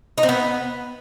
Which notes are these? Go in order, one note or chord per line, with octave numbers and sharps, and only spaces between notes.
D#4
C4
B3